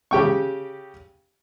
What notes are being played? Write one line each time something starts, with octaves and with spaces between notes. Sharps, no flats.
C#3 G4 G5 C#6